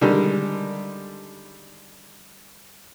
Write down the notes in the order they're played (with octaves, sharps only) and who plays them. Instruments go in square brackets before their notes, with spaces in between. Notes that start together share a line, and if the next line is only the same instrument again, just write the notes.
[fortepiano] D3 D#3 G3 G#3